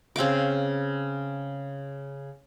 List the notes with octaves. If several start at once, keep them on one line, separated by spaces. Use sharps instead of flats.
C#3 C4 F5 D6